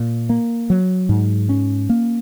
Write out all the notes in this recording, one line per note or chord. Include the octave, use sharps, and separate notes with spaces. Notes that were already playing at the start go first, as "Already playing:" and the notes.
Already playing: A#2
A#3
F#3
G#2
C#4
A#3